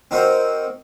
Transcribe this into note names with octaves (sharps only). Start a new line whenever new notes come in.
C4 D#4 F#4 A#4 C5